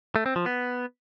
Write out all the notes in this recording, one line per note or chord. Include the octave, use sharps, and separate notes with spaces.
A3
C4
F3
B3